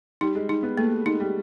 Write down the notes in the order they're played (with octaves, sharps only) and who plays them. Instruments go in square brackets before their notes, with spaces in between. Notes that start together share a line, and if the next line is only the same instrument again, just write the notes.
[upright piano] G3 [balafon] D#4
[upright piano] G#3
[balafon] D#4
[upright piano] B3
[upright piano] A3 [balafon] A#3
[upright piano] G#3 [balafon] D#4
[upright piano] G3